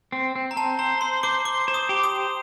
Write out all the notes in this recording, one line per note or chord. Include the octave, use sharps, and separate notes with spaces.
C4
C4
A#5
C4 A5
C5 A#5
C5 C6
C5 D6
C5 D6
C5
D#6
G4
D#6
C5